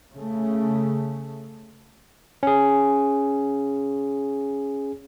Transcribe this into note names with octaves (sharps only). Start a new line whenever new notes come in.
C#3 A3
C#4 G#4